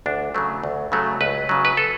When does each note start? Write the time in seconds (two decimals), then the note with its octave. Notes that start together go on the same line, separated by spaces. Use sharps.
0.06 D2 D4
0.35 C#3 F#3 A3
0.64 D2
0.92 C#3 F#3 A3
1.21 C#2 B4
1.49 C#3 F#3
1.65 B4
1.77 A4